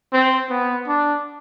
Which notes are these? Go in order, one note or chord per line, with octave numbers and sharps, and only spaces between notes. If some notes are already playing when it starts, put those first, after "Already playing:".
C4
B3
D4